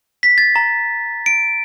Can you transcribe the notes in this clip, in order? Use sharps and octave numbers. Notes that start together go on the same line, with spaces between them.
B6
A6
A#5
D7